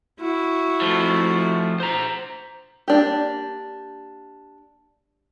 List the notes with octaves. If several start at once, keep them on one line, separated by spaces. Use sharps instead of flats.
E4 F#4
F3 A3
C5 A#5
A#3 D4 G4